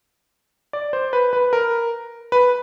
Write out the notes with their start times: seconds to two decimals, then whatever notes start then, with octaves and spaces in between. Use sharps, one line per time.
0.73 D5
0.93 C5
1.13 B4
1.33 B4
1.53 A#4
2.32 B4